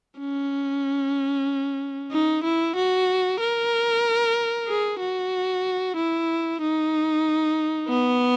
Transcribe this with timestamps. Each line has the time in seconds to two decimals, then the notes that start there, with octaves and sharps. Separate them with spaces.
0.19 C#4
2.12 D#4
2.44 E4
2.76 F#4
3.40 A#4
4.68 G#4
5.00 F#4
5.97 E4
6.62 D#4
7.89 B3